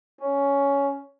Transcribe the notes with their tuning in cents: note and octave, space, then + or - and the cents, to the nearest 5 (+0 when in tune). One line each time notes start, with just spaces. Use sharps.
C#4 +10